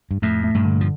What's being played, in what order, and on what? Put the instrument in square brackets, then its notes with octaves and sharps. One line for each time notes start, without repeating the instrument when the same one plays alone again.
[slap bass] G2
[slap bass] F2 A2 [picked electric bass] A3
[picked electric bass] A3
[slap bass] G2 A#2
[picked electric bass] D3
[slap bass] F3